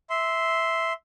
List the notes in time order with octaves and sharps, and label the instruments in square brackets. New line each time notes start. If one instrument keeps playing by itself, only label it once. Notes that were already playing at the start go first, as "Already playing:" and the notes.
[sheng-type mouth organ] E5 C6